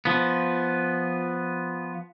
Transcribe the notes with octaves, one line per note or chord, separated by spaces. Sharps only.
F3 B3